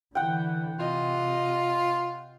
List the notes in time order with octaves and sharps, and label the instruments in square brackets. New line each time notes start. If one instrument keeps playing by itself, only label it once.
[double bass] D3 E3 [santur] F#5 G5
[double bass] C3 [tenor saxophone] F4 [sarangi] D#5